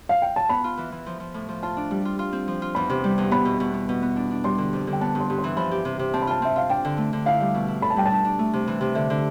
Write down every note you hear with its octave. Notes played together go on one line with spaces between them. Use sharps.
F5
G5
A5
B3 B5
F4
E3
E3
F3
F3
A2
F3
F4 A5
D4
G3
F4
F4
C4
F3
F4
E2 B5
C3
G3
E2
B3 B5
B2
B2
B3
B2
B3
D4
D4
G3 C6
D3
F2
D3
G5
B3 A5
G2
C6
G2
C6
E3
F3 B5
G4
C3
C3
C4 A5
B5
F4 A5
C4 E5
F4 F5
D4 G5
D3
A3
D3
E4 F5
G3
B2
E4
A4 B5
A5
G3 G5
D4 A5
D4
A3
C3
E3
C3
D3 E5
D3